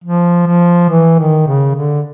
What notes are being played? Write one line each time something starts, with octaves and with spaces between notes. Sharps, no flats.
F3
F3
E3
D#3
C#3
D3